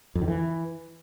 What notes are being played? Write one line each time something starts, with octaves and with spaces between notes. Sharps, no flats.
F2
D#3
E3